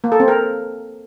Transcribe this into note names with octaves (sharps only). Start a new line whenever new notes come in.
A#3
A4
C4
A#4